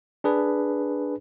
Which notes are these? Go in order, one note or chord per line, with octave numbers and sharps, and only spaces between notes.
D4 G#4 B4